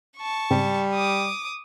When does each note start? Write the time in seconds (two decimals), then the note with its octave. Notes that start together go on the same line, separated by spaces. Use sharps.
0.17 A5 C#6
0.50 G#2 C#3 G3 C4
0.94 D6 D#6